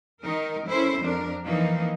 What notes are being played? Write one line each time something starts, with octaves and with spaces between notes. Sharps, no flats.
D#3 D#4 A#4
C#4 E4 A4 C5
F2 D4 A#4
E3 F3 A#3 D#4